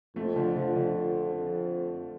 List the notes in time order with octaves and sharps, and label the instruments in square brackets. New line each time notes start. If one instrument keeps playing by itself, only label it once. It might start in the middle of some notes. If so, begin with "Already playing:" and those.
[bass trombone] F2 [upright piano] F3 A3
[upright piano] D3 F3
D3
D3
[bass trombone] F2